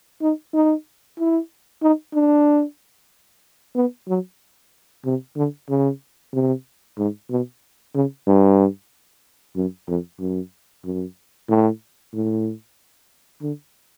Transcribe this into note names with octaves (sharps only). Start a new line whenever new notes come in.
D#4
D#4
E4
D#4
D4
B3
F#3
C3
D3
C#3
C3
G#2
B2
C#3
G2
F#2
F2
F#2
F#2
A2
A2
D3